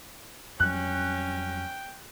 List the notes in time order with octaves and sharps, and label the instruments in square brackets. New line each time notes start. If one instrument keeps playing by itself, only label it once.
[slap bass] F2 F#3 G3 [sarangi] C#4 [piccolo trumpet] G5 [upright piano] F#6